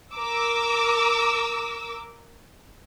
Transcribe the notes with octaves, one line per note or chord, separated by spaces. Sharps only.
A#4 D6 E6